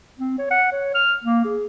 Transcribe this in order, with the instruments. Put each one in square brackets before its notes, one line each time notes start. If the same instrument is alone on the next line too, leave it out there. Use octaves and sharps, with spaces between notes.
[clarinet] C4
C#5
F#5
C#5
F6
A#3
G#4